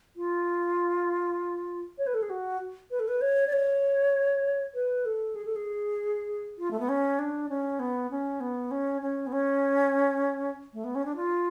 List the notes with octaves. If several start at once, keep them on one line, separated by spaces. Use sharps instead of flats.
F4
C#5
B4
A4
G#4
F#4
B4
A4
B4
C#5
D5
C#5
B4
A4
G#4
A4
G#4
F4
A3
B3
C#4
D4
C#4
B3
C#4
B3
C#4
C#4
B3
C#4
A3
B3
C#4
D4
F4